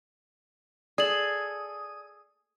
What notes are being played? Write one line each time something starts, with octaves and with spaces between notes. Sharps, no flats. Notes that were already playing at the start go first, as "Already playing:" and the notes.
G#4 A4 D5 D#6 F#7